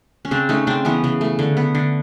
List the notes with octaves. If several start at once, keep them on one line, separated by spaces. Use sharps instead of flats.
C#4
C#3 C4 D4
A3 C#4 D#4
C#3 C4 D4
E3 B3 C#4
C#3
A3
D3
B3
D3